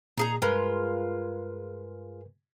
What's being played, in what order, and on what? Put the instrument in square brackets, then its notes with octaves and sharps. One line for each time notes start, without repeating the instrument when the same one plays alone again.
[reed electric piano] A#2 [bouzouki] D#4 G#4 A#5
[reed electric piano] G2 A#4 B4 [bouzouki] G#3 F4